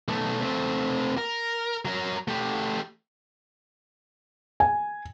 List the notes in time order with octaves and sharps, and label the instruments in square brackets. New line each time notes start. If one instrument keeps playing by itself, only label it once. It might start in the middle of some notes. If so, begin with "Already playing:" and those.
[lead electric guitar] B1 A3
A3 C4
A#4
F#3 A#4
A3 G4
[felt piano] G#5